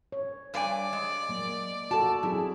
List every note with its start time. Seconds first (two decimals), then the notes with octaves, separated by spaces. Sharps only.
0.12 C#5
0.54 G2 D5 G#5
0.93 G#3
1.29 F#3 A#3
1.91 F#4 A4 A5
2.23 F#3 C4 E4 G#4